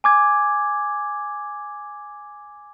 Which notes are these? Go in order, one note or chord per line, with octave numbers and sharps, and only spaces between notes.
G#5 D6 G#6